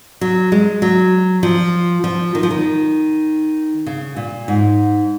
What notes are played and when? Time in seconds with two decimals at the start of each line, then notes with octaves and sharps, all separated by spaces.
0.21 F#3
0.52 G#3
0.82 F#3
1.43 F3
2.04 F3
2.35 D#3
2.43 F3
2.50 D#3
3.86 C#3
4.16 A#2
4.48 G#2